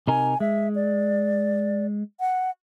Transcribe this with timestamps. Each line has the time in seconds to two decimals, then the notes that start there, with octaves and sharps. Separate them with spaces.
0.08 C3 D#4 A#4 G#5
0.40 G#3 E5
0.75 D5
2.20 F#5